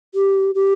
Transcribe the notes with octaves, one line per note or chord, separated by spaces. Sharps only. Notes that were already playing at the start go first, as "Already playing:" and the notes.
G4
G4